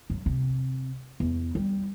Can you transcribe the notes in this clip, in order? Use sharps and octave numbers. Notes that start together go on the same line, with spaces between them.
F#2
C3
E2
G3